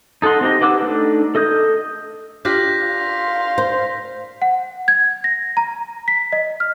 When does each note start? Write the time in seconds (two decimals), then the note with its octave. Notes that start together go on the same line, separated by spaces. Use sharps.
0.22 D#4 A4 D#5 F#5 C6
0.41 C4 D#4 G4 D#5
0.61 G4 B4 F#5 D6 E6
0.82 A3 D4 D#4
1.35 A4 D#5 D#6 F#6 G6
2.45 D4 F4 G4 G6 A#6 B6
2.85 F5 C6
3.58 C5
4.42 F#5
4.88 G#6
5.24 A#6
5.57 A#5
6.08 B6
6.32 D#5
6.60 F6